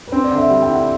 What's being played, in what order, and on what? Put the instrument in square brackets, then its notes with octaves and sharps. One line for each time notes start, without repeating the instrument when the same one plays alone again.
[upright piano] B4
[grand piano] C4 [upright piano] C5
[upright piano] D5
[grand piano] D3
[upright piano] E5
[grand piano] G3 [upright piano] F#5
[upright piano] G5
[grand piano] E4
[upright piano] F#5